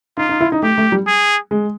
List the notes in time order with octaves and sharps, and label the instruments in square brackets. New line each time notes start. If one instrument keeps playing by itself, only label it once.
[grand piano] D#4 [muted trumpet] F4
[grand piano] D#4
E4
D#4
[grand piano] A3 [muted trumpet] G4
[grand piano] A3
G3
[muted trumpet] G#4
[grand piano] G#3